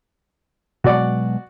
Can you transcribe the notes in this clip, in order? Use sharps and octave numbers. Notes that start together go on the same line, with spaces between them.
B2 F#3 G#3 F#4 D5 F#5